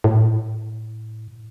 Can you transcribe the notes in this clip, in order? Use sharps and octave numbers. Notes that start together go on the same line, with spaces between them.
A2